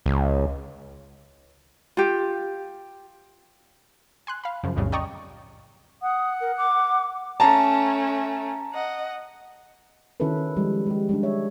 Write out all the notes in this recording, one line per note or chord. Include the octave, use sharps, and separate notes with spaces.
C#2
F4 G4
G#5 C6 F#6
F5 B5
F#2 C#3 F3
B1 F2 A2 C#3 G3
D5 D#5 G5 A#5 C#6 D#6
F#5 D#6
A#4
D6
A3 C#4 A5 A#5
D#5 F#5
D#3 C#4 E4 F#4 A4 B4
F3 G3 G#3
G#3 G4
G3 G#3 D4
C#5 E5